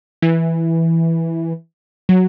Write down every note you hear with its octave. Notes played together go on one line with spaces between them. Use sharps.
E3
F#3